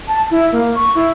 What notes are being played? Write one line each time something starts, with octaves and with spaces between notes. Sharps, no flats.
A5
E4
A#3
C#6
E4